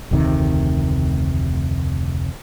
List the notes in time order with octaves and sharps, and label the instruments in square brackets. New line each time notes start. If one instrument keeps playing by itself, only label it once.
[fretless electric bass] F1 D2 C3 D#3